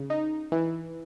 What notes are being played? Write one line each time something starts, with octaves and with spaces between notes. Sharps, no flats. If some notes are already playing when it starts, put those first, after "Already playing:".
Already playing: C#3
D#4
E3